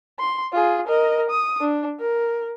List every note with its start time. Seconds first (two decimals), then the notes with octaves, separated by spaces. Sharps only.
0.19 C6
0.52 F4 G#4
0.87 A#4 D#5
1.30 D#6
1.60 D4
2.00 A#4